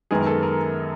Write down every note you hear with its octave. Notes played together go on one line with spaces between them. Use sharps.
F#2 D#3 G#3 B3 G#4
A#4
A4
A#4